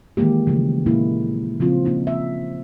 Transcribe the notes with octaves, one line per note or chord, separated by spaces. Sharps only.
D#3 E3 G#3 A#3 G4
C#3 E3 F3 A3
A#2 G#3 A#3 D#4 E4
C#3 F3 C4 F4
A#3 D#4 F4
E5